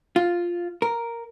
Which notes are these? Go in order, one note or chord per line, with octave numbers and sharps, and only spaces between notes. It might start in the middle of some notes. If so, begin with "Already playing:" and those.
F4
A#4